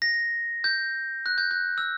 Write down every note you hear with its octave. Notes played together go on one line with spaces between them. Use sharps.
A#6
G6
F#6
G6
F#6
E6